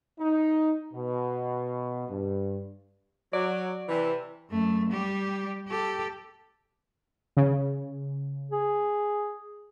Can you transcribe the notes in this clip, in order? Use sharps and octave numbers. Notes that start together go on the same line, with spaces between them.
D#4
B2
G2
F#3 D5
C3 E3
F#2 A3
G3 G4
G4 A4
C#3
G#4